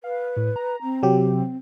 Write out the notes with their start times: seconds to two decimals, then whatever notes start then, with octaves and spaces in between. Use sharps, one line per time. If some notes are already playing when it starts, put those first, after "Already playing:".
0.04 B4 F5
0.36 A2
0.56 A#5
0.83 C4
1.03 C3 F#3 G4